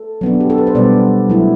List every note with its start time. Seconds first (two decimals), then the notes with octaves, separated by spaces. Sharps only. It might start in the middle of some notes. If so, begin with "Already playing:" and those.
Already playing: A4
0.21 F#3 B3 D4
0.40 G4
0.50 A4
0.58 B4
0.67 C5
0.75 B2 G3 B3 D4 D5
1.30 F#3 A3 E4